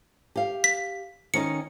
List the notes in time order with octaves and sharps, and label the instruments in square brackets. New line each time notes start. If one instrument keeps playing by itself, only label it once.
[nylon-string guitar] G4 F5
[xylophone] B6
[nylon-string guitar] D#3 C#4 D#4 [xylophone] C#7